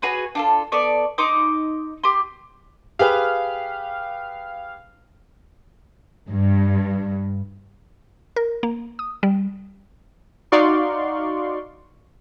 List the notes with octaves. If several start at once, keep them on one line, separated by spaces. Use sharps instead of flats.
F#4 G#4 B4 C#5
D4 F4 A4
B3 A4 D5 C#6
D#4 C6 D6 D#6
G4 C6
G4 G#4 B4 F5
G2
A#4
A#3
D#6
G3
D#4 F#4 D5 F5 C6 C#6